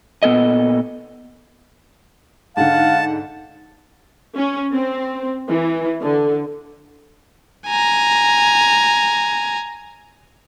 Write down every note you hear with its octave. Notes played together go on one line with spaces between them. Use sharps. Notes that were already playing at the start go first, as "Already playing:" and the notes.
A#2 B3 A4 D#5
G#2 D3 F5 F#5 A5
C#4
C4
E3
D3
G#5 A#5